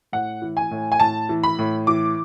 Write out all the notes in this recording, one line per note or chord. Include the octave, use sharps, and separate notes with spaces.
A2 F#5
E3
G#5
A2
G#5
A2 A5
E3
B5
A2
E3 D6